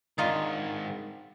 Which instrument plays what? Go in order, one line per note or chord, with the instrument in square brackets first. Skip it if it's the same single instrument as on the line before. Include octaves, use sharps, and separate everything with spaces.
[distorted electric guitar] G#2 D#3 [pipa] D4 D#4 F4